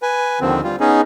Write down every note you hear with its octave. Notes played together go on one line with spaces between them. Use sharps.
B4 G#5
D#2 D3 D#3 F3 C4
G3 F4
B3 C#4 D#4 G#4